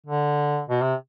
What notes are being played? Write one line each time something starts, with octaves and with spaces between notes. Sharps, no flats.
D3
B2
C3